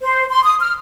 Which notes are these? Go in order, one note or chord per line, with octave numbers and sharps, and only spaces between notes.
C5
C6
D#6
F6